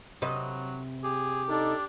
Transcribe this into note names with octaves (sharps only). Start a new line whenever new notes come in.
C3 F#3 B4 D#5
G4 G#4
D4 D#4 A4